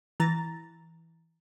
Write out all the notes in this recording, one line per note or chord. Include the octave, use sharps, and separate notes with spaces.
E3 A#5 A6